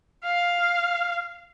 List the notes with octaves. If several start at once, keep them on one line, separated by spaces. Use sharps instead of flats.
F5